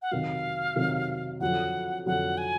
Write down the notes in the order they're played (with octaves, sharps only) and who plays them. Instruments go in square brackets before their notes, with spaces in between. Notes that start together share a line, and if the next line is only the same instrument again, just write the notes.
[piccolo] F#5
[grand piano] C3 D#3 F#3 [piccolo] F5
[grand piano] C3 D#3 F#3
[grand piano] F2 D3 F#3 [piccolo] F#5
[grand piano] F2 D3 F#3 [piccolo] F#5
[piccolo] G#5